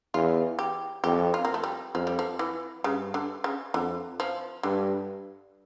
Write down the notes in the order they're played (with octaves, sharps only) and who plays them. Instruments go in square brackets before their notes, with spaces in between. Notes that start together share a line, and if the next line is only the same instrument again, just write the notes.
[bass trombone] E2 [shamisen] F4
[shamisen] G4
[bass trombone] F2 [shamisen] G4
[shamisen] F4
A#3
A3
G3
[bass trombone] F2 [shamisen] F3
[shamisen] G3
F3
E3
[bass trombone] G2 [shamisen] C#3
[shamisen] D3
C#3
[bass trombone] F2 [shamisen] D3
[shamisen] F3
[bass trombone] G2 [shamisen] D3